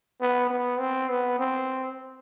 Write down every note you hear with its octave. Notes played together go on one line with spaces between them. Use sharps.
B3
B3
C4
B3
C4